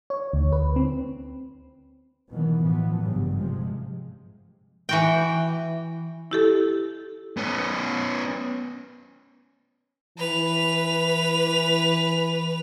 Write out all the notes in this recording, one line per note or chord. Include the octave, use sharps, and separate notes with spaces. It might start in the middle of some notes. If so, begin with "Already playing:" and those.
C#5
D2
B4
C4
B2 D#3 E3 F#3 B3
A2 C#3 E3 F3 B3
G#1 G2 A#2 C#3 F#3 G3
C3 F3 G#3
E3 F#4 G5
E4 G4 A4
B3 C#4
E3 B4 F7